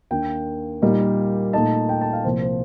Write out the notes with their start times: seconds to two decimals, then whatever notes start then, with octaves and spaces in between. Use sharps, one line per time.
0.11 D#2 D#3 A#3 D4 G5
0.82 A#2 G3 A#3 D#4
1.53 A#2 A3 D#4 A5
1.89 G5
2.01 A5
2.13 F5
2.24 C2 A#2 F3 A#3 C5
2.42 C5